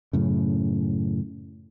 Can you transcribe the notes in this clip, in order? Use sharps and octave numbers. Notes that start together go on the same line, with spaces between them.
F#2 A2 C#3